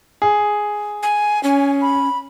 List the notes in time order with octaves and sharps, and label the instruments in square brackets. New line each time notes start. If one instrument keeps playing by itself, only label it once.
[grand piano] G#4
[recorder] G#5
[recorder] C#4 [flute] G#5
[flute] B5